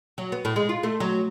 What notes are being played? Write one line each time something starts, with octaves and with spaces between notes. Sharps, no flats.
F#3
B3
A2
G#3
F4
A3
F#3